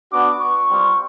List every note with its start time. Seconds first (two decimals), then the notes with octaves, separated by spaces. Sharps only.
0.11 B3 D4 F#4 D6
0.39 C#6
0.69 G3 C4 F4